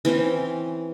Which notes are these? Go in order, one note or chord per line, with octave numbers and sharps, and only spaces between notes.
E3 C4 C#4 C5